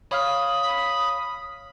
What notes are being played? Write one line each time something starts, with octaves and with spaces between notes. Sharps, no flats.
C#5 F5 B5 D#6 F6